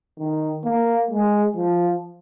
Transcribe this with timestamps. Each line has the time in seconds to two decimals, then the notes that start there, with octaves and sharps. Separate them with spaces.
0.19 D#3
0.65 A#3
1.11 G#3
1.56 F3